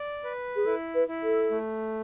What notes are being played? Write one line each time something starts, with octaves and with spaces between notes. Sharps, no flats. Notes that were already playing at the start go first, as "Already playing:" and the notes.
Already playing: D5
B4
G#4
E4 A4
B4
E4
A4
A3